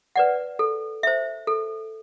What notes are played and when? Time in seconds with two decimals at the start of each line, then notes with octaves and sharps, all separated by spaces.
0.16 B4 D5 F#5
0.59 A4
1.03 C5 E5
1.47 A4